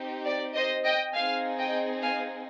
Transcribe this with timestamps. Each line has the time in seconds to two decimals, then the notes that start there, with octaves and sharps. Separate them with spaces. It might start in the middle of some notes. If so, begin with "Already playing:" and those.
Already playing: C4 D#4 G4
0.26 D5
0.55 C5 D#5
0.84 D#5 G5
1.14 C4 D#4 G#4 F5 G#5
1.58 D#5 G5
2.02 F5 G#5